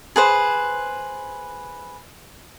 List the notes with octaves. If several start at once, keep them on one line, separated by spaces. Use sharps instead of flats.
G#4 B4 C5